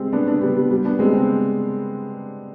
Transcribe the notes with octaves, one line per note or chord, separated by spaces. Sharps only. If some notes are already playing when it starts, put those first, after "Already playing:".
Already playing: G3 G#3 C4
B3 D4
B3 D4
G3 B3
G3
G3
B3 D4
G#3 C4
C4